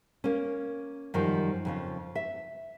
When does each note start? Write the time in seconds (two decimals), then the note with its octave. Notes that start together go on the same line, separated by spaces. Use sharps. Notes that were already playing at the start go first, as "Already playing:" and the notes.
0.24 A#3 C#4
1.14 F#2 D#3 F3 G3
1.65 F2 C#3 F4
2.15 E5